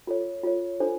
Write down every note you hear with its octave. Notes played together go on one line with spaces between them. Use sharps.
F4 A4 C#5
F4 A4 C#5
D4 F4 A4 C5